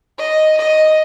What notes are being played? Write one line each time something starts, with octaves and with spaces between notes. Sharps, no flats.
D#5
D#5